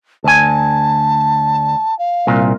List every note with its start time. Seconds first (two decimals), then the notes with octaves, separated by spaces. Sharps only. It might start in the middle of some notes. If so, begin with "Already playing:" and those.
0.24 D2 G#5 A5
1.99 F5
2.27 C2 A#2